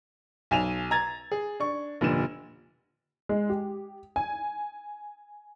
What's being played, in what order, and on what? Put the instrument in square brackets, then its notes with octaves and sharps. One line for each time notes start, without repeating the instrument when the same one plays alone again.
[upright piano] B1 G#5 E7 F7
A#5 G#6 A6
G#4
D4 C#6
F1 A#2 D3 E7
[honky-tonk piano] G#3
G4
G#5